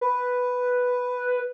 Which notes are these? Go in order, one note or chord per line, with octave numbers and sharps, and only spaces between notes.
B4